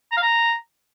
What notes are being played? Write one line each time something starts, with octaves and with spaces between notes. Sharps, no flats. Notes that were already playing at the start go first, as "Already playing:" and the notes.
A#5
F5
A#5